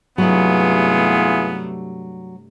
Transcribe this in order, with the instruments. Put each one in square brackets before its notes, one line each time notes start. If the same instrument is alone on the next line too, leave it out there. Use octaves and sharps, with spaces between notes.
[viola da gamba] G2 C3 A3 [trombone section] E3 F4 G#4 [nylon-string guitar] F#3 [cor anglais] B3